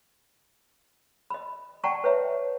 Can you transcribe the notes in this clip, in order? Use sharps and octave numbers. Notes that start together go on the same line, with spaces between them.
D#5 B5
D5 F#5 G5 A5 A#5 C#6
B4 C#5 E5 A#5